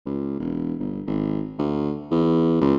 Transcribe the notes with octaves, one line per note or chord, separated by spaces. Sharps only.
C#2
E1
G1
G#1
D2
E2
C#2